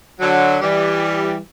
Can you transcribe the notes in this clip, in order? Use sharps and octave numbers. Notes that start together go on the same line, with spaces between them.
D3 F#3
E3 G3